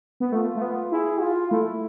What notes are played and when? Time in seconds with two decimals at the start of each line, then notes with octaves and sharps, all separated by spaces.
0.20 B3
0.32 A3 F4
0.55 A3
0.62 B3
0.91 E4 G#4
1.21 F4
1.50 A3 E4